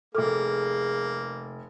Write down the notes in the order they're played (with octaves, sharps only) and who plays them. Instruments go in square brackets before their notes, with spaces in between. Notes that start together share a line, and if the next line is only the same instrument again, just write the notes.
[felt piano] F1 F6 [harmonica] A#3 [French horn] G#4 [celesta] A4 D6